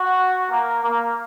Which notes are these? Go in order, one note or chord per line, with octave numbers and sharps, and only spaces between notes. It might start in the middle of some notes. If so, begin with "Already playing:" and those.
Already playing: F#4
A#3
A#3